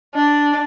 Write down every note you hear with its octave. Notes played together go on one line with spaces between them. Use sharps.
D4